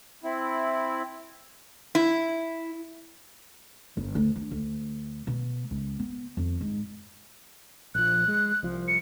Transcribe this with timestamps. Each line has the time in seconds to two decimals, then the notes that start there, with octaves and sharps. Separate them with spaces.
0.24 C4 E4
1.95 E4
3.97 G1
4.15 D2
4.36 D4
4.51 D2
5.27 B2
5.71 C#2
5.99 B3
6.37 F2
6.61 G#2
7.95 A#1 F3 F#6
8.28 G#3
8.63 C2 F3
8.88 C#7